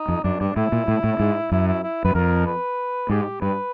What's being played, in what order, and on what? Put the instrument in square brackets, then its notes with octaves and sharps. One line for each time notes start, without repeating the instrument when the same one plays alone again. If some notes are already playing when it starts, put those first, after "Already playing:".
Already playing: [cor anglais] D#4
[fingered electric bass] F2
[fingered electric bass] F#2 [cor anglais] D4
[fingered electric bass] G2 [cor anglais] D4
[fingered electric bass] A2 [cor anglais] E4
[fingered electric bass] A#2
A2
A2
G#2
[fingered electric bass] F#2 [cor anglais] E4
[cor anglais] E4
E4
[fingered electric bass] F#2 [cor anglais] B4
[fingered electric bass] F2 [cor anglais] A#4
[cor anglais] B4
[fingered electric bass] G#2 [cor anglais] G4
[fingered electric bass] G2 [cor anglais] B4